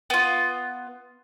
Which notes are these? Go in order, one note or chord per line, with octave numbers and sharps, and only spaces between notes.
B3 F4